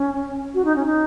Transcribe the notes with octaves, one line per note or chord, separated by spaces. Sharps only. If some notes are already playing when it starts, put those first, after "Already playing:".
Already playing: C#4
F#4
D#4
C#4
D#4